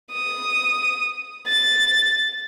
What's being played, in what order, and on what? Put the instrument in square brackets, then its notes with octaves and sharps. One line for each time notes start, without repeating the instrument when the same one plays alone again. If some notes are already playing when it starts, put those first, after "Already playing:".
[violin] D#6
A6